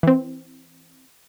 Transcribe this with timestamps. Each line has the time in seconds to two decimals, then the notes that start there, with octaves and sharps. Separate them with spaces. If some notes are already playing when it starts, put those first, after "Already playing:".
0.03 E3 C4